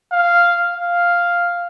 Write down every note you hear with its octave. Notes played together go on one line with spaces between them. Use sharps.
F5
F5